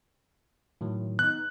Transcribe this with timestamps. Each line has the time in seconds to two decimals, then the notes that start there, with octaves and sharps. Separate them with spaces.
0.81 A2 D#3 F#3
1.19 B3 D#4 F#6